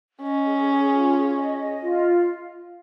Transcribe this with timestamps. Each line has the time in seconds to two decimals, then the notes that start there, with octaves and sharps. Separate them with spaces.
0.21 C#4 D#5
0.45 G#4
0.68 G#4
0.92 F4
1.14 G#4
1.37 D#5
1.60 D#5
1.82 F4